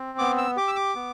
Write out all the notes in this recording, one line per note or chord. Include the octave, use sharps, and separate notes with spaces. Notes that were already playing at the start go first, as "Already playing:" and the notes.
Already playing: C4
B3 D6
E6
G4 D6
E6
D6
B3